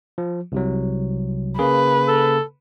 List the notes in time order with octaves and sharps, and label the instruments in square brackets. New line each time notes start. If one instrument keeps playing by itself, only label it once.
[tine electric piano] F3
C2 C3 F#3
[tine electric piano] C#3 A#3 G#4 [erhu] B4
[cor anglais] A4